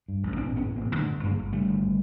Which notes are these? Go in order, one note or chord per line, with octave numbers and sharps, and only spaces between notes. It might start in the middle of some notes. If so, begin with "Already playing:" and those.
G2
A1
A1 C4 D4
A2 B3 C#4
A2
A#3 C4
A1
D3 A3 B3
G1
G2 G#3 A#3
G1
D3 G3 A3
G#1